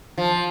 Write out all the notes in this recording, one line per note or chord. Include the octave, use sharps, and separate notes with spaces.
F3